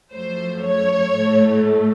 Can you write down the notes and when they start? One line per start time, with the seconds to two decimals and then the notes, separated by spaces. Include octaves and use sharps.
0.12 F#2 F3 A3 C5
0.64 C#5
1.15 A2 A3